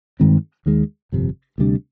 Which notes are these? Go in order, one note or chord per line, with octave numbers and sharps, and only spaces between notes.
G2 D#3 G#3 C4
D#2 D#3 G#3
G1 F2 C3
D2 C3 G3 D4